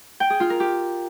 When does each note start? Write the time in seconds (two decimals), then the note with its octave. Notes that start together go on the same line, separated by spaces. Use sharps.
0.20 G5
0.30 G#4
0.40 F4
0.50 A#4
0.60 G4